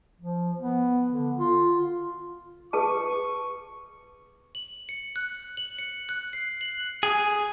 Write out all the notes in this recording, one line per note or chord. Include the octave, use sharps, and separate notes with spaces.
F3
B3
D3
F4
G#4 B4 A5 C#6
F#7
C#7
F#6
F#7
C#7
F#6
C7
F#7
G#4